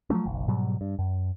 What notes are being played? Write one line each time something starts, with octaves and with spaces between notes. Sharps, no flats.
F3 F#3 A3 C#4
F#1 B1
G#2 B2 F#3 G3
G2
F#2